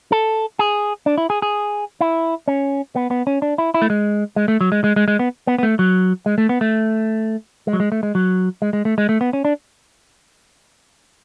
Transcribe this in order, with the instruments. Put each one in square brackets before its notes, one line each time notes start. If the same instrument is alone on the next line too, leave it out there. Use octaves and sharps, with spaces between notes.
[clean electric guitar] A4
G#4
D4
E4
G#4
G#4
E4
C#4
B3
B3
C#4
D4
E4
E4
A3
G#3
G#3
A3
F#3
G#3
G#3
G#3
G#3
B3
B3
B3
A3
F#3
G#3
A3
B3
A3
G#3
F#3
G#3
A3
G#3
F#3
G#3
G#3
A3
G#3
A3
B3
C#4
D4